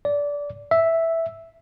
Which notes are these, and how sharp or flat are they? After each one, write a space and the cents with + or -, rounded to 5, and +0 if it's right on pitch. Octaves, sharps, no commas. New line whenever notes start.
D5 -20
E5 +0